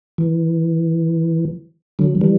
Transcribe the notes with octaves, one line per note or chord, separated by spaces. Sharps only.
E3
D3 F#3
E3 G3